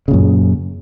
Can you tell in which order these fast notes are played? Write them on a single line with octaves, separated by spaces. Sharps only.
C#3 A#2 F#2